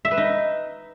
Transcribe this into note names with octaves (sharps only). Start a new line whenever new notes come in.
E5
B4
D#4